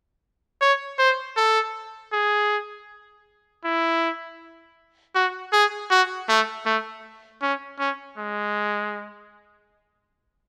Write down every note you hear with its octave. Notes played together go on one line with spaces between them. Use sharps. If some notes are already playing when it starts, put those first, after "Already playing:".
C#5
C5
A4
G#4
E4
F#4
G#4
F#4
A3
A3
C#4
C#4
G#3